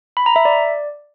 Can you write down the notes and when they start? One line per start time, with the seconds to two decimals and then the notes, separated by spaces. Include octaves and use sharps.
0.17 B5
0.26 A#5
0.36 E5
0.45 D5